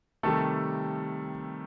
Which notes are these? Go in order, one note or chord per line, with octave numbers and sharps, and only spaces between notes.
C3 D#3 G3 A3 A4